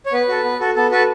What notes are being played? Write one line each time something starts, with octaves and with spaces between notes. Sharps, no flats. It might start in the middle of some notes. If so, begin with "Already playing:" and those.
C#5
B3 B4
F#4 A4
B3
F#4 A4
B3 A4
F#4 A4 B4